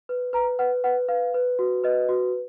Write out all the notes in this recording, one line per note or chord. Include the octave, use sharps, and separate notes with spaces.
B4
B4 A#5
B4 F#5
B4 F#5
B4 F5
B4
F#4
B4 D#5
F#4